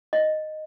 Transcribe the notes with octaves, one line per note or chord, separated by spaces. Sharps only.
D#5